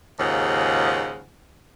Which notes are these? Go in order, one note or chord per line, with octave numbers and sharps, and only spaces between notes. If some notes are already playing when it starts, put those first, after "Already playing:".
D#2 G#2 C#3 F4 F#5